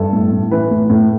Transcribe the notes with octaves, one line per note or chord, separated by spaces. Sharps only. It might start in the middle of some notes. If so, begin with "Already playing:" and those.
Already playing: G2 A4
A2
A2
E3 B4
A2
A2